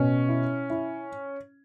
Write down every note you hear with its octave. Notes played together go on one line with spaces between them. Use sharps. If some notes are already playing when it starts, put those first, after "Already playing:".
Already playing: B2 C#4
E4
E4